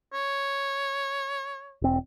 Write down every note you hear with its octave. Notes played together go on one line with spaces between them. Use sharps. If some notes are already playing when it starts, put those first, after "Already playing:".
C#5
E1 C4